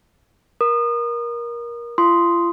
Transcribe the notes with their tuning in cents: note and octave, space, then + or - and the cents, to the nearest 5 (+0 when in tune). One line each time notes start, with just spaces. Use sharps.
A#4 +20 D#6 -30
F4 -40 C6 -5 D#6 +0